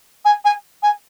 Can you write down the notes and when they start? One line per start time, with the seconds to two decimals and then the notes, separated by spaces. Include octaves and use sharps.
0.25 G#5
0.44 G#5
0.82 G#5